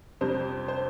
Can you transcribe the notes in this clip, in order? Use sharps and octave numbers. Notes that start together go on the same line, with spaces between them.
F2 C3 G3 D4 C5
C5